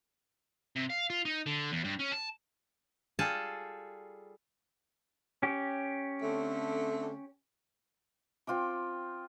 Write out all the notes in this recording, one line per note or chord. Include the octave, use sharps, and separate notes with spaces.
C3
F5
F4
D#4
D3
E2
G2
C#4
A5
G3 F4 G#4 A4 A5
C#4 G4
D3 A3 C4
C4 F4 G5 D6